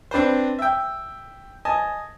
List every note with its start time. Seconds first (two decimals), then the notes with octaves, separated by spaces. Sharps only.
0.11 C4 D4 B4 C5
0.59 E5 G5
1.65 D#5 G#5 A5